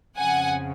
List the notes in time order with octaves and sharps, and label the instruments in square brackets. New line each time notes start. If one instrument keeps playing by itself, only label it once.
[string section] F2 C#3 F3 F#5 G#5